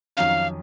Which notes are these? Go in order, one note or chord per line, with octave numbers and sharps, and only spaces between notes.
F2 D#3 F#3 C#4 F5